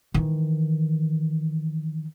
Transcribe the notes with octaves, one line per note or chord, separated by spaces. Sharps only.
D#3 E3